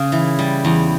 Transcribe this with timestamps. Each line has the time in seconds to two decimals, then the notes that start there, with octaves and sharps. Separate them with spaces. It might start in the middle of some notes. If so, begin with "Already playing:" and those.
Already playing: C#3
0.12 E3
0.39 G3
0.65 E2